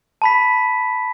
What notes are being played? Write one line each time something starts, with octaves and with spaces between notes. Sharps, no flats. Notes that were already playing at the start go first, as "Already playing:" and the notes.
A5 B5 B6